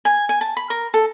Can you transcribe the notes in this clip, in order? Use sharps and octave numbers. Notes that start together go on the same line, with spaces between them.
G#5
G#5
A5
B5
A#4
A4